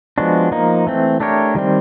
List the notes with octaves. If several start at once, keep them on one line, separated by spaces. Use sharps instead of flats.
F3 G#3 B3 D4 F#4
F3 A#3 D#4
E3 A3 C4
A3 D4 G4 A#4 C#5
D#3 G3 C4